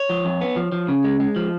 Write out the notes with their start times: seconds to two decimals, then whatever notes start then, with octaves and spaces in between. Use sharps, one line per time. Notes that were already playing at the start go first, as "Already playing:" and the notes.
Already playing: C#5
0.09 F3
0.25 F2
0.41 B3
0.56 F3
0.72 F3
0.88 C#3
1.04 G#3
1.20 G#3
1.36 F3